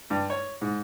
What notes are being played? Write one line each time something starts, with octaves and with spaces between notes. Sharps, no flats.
G2
C#5
G#2